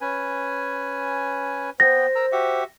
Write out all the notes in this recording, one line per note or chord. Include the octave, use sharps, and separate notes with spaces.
C#4 B4 G#5
B3 C5 G5 A#6
A#4 A#5 E6
F#4 G4 E5